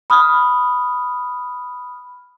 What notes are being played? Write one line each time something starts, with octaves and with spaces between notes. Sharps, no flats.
B5 D#6 F6